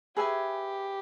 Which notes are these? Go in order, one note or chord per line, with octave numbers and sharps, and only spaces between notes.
G4 G#4 B4 E5 G#5